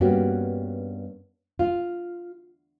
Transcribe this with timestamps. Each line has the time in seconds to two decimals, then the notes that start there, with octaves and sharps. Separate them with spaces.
0.01 G2 A#3 B3 C#4 F#4 G4
1.59 F4